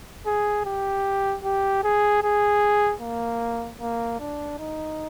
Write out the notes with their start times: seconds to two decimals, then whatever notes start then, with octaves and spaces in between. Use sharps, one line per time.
0.26 G#4
0.66 G4
1.44 G4
1.84 G#4
2.23 G#4
3.01 A#3
3.81 A#3
4.20 D4
4.59 D#4